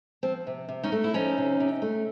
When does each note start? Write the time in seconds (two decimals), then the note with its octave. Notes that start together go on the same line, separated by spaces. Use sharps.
0.23 F3 C4
0.47 C3
0.68 C3
0.83 C#4 D#4
0.92 A3
1.04 E4
1.14 F3 C#4 D#4
1.38 C3
1.60 C3
1.82 A3